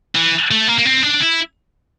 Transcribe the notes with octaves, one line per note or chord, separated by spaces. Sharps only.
E3
A3
A#3
A#3
C4
D4
E4